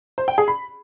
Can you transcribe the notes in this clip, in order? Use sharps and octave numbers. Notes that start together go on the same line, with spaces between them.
C5
G5
G#4
B5